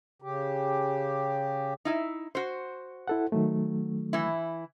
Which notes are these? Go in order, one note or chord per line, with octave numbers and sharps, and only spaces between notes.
C#3 G4
D#4 E4 E5
F#4 C5
E4 A4 F#5
D#3 F#3 A3
E3 E4